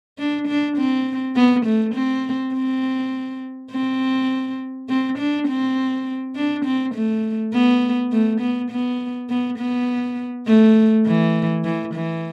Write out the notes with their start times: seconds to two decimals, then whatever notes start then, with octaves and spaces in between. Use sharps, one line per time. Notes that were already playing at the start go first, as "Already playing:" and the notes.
0.18 D4
0.48 D4
0.77 C4
1.36 B3
1.66 A3
1.95 C4
2.54 C4
3.71 C4
4.89 C4
5.18 D4
5.48 C4
6.36 D4
6.65 C4
6.95 A3
7.53 B3
8.12 A3
8.41 B3
8.71 B3
9.30 B3
9.59 B3
10.47 A3
11.06 E3
11.64 E3
11.94 E3